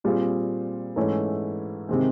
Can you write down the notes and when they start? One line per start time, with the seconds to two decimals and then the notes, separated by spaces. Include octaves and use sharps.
0.04 A#2 G3 C4 F4 G#4
0.96 G#2 E3 A3 C#4 E4
1.89 C3 D#3 G#3 C4